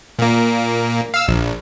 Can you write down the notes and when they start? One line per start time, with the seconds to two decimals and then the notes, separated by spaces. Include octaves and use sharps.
0.19 A#2 A#3
1.14 F5 E6
1.28 A#1